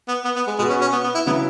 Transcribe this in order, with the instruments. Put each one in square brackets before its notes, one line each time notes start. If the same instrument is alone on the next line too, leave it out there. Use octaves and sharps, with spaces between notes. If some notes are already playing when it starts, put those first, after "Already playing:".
[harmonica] B3
B3
B3
G#3
[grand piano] B2 B3 F#4 [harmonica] G#3
[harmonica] C#4
C#4
B3
B3
E4
[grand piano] C#3 F#3 E4 [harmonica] B3